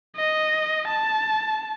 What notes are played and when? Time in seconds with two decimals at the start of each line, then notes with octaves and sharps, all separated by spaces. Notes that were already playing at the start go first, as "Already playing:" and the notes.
0.16 D#5
0.88 A5